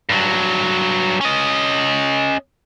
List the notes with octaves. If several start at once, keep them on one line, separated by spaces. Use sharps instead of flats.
G2 F#3
C#4 D#5